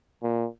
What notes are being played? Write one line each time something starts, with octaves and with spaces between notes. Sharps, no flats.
A#2